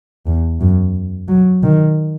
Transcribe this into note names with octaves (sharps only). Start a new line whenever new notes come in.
E2
F#2
F#3
D#3